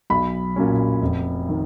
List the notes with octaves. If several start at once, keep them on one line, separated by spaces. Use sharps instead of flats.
B1 B5
A#2 F#3 C#4
F1
D#3